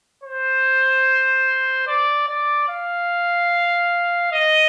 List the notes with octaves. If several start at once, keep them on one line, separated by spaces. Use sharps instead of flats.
C5
D5
D5
F5
D#5